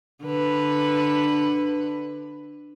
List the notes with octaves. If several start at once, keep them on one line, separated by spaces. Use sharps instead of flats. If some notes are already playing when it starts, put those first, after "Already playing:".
D3 B4